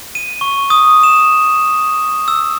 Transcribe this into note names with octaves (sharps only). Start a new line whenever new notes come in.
D#7
C#6
D#6
E7
E6